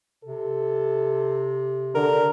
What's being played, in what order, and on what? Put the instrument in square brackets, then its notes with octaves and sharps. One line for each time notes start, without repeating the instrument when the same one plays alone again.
[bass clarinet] C3 [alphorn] A4
[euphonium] D3 [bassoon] A#4